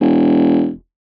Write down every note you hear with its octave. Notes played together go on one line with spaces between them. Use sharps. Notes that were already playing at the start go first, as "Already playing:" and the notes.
E1